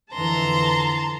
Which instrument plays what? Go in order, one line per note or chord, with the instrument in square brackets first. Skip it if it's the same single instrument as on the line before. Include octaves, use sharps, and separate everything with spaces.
[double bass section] F2 D3 E3 [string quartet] A5 A#5 C6